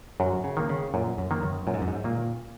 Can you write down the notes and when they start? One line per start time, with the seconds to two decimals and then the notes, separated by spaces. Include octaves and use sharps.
0.20 F#2 F#3
0.44 C#3
0.57 D#3 A#3
0.69 C#3
0.94 F#2 A#2
1.18 F#2
1.31 D#3 A#3
1.42 F#2
1.67 F#2 A#2
1.74 G#2
1.82 F#2
1.88 G#2
2.04 A#2 D#3 A#3